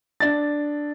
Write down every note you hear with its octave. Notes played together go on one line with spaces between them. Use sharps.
D4 A6